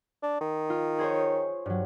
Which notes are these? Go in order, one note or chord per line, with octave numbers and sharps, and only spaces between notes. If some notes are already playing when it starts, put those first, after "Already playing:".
D4
D#3
F4
G#4 C5 C#5
G2 F#3